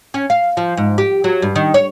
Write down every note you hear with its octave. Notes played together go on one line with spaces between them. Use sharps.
C#4
F5
F3
G#2
G4
F#3
G2
D#3
C#5